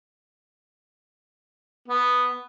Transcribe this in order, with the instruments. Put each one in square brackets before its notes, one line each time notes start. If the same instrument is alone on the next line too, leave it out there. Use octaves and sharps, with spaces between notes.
[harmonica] B3